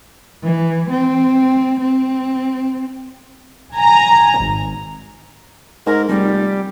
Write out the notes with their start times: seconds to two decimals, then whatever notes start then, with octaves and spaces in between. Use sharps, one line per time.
0.42 E3
0.90 C4
1.80 C4
3.73 G#5 A#5
4.39 G#1
5.86 G#2 A#4
6.09 F1 G3